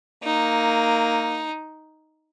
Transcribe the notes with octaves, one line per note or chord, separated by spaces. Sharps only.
A#3 D#4